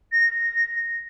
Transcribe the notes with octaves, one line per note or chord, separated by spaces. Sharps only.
A#6